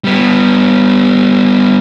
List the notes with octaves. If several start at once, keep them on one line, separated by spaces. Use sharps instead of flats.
G3 B3